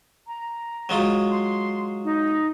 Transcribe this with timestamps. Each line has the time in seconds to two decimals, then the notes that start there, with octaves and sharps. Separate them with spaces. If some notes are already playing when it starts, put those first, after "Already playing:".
0.27 A#5
0.89 F#3 G#3 F4
1.30 C6
2.04 D#4